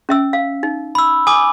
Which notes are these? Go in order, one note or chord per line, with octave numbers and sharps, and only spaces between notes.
C#4 E5 E6
F5
D#4
B5 E6
G#5 D6 D#6